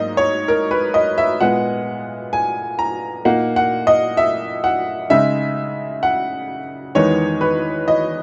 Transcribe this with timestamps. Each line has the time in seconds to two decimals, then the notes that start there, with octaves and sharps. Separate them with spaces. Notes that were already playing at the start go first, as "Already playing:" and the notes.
Already playing: G#2 F#3 A#3 D#4 D#5
0.17 C#5
0.48 A#4
0.71 B4
0.94 D#5
1.18 E5
1.40 A#2 G#3 B3 F#5
2.33 G#5
2.79 A#5
3.25 A#2 A#3 D#4 F#5
3.56 F#5
3.87 D#5
4.17 E5
4.64 F#5
5.10 C#3 G#3 D#4 E5
6.03 F#5
6.95 E2 D#3 G#3 B3 D#4 C#5
7.41 B4
7.88 D#5